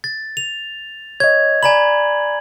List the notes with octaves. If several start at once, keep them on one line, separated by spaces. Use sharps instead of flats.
A6
F7
C#5 D#5 G#6
D5 G#5 A#5 B5 F#7